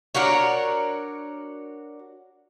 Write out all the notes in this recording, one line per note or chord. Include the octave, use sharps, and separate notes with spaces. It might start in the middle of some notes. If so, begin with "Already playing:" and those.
D4 F#4 A#4 C#5